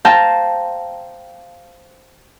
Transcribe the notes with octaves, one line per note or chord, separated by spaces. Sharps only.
C5 F5 G5 A5 A#5